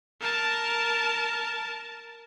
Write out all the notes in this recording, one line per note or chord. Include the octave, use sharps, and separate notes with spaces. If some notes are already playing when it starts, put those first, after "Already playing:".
A#4 A5